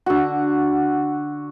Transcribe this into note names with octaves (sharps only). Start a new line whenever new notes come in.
D3 F#4